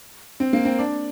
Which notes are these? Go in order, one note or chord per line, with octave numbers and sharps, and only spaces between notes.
C4
A#3
C4
D4